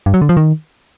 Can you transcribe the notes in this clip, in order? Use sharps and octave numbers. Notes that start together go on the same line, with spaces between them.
G2
F#3
D3
F3
D#3